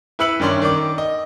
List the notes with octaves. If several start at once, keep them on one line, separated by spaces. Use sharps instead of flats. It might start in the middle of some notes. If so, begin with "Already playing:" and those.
E4 B4 E5 E6 C#7 F#7
G2 D#3 C#4 D5 C6
D#3 D5 D6
D#5